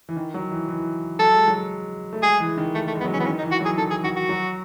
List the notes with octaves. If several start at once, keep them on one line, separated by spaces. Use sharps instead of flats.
E3
D#3
F#3
E3
E3
F#3 A4
G#3
F#3
A3
G#3 G#4
E3
D#3
A3
A3
G#3 B3
F#3
C#4
E3 B3
D#3 C#4
D#4
E3
F#4
F#3 G#4
D#3 A4
G#4
D#3 F#4
F#4
F#3